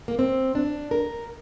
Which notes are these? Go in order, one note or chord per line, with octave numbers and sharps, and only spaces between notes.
A#3
C4
D4
A#4